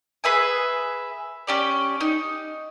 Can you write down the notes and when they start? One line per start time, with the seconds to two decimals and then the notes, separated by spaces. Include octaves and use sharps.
0.24 G#4 B4 E5 G#5
1.47 C#4 G4 D5
2.01 D#4